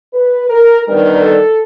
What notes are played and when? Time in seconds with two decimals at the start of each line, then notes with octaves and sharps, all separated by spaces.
0.14 B4
0.50 A#4
0.86 D#3 G3 B3 D4 A#4
1.23 A4